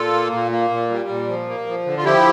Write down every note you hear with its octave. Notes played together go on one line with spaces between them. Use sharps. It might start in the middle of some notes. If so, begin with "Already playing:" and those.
Already playing: A#2 F4 A4
A#3
A#2
A#3
A#2
G3
A#2
F3
A#3
F3
D3
F4
F3 E4 G4